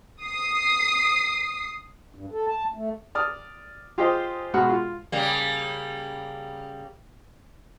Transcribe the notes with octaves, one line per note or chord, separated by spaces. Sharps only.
D#6 C7
G2
A4
A5
A3
D5 D#6 F6
F4 G4 G#4 C5 D#5
B2 G#3 F#4 F#5 B5 F6
F4
C#3 G3 A#3